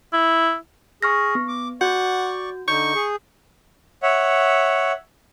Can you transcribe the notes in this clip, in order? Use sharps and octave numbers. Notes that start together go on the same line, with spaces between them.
E4
G#4 C#6 F6 A#6
B3
D6
F#4 D5 F#5 C#6 G6
D3 D#4 C#6 G6
G#4
C#5 E5 F#5